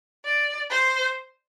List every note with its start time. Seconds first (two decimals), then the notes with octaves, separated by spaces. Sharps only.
0.25 D5
0.70 C5